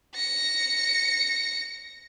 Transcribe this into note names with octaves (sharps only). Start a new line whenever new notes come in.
A#6 C#7